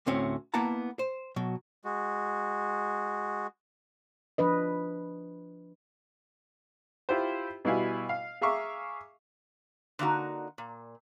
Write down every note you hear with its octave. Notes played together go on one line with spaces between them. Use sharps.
D2 A2 C4 C#4
A#3 B3 E4 F#5 A5 A#5
C5
B2 F#3
G#3 F#4
F3 D4 B4 D#5
E4 F4 G4 C5
B2 G3 E4 F5 G#5
F5
G#4 E5 F5 A#5 C#6 D6
D3 A#3 D#4 F#4
A#2